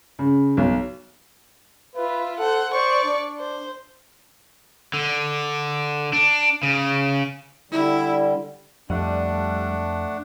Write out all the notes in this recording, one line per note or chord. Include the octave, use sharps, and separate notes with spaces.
C#3
B1
F4 B4 E5
A4 C5 F#5
C5 D5 C#6
D4
C5
D3
D4
C#3
D3 G3 E4
F2 G3 A3 D4 F#5